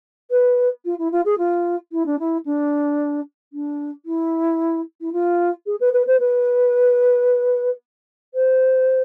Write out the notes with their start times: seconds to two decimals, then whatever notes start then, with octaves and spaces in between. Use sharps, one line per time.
0.31 B4
0.85 F4
0.99 E4
1.12 F4
1.25 G#4
1.38 F4
1.92 E4
2.06 D4
2.19 E4
2.45 D4
3.53 D4
4.05 E4
5.01 E4
5.12 F4
5.66 G#4
5.80 B4
5.93 B4
6.07 C5
6.20 B4
8.34 C5